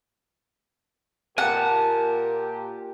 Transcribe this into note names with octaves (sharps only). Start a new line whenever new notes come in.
A#2 F4 G4 A#4 F#5 G#5 A5